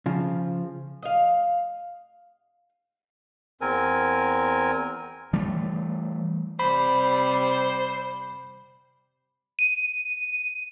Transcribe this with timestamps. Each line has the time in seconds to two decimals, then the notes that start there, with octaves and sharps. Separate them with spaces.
0.06 C#3 F3
1.03 D#5 F5
3.61 E2 C4 A#4 G#5
5.33 E3 G3 A3
6.60 C3 G3 C5 B5
9.59 D#7